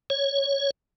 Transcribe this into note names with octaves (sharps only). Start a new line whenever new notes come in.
C#5